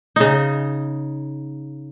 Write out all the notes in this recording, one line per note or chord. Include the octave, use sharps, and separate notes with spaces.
C#3 D#4